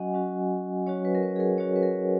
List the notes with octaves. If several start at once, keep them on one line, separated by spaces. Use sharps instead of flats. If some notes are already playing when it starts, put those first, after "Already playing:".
Already playing: F#3 C#4 F#4 D#5 F#5 G#5
F#3 C#4 F#4
F#3 C#4 F#4 C#5
B4
A#4
B4
G#4
A#4
F#3 C#4 F#4 C#5
B4
A#4